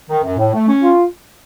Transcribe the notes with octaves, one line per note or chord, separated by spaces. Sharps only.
D#3
F#2
A2
A3
C#4
F4